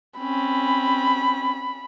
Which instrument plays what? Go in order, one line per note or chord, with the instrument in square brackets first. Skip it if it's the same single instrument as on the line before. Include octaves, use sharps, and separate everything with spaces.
[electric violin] C4 C#4 [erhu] B5